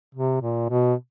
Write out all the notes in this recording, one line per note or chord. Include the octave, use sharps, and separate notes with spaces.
C3
A#2
B2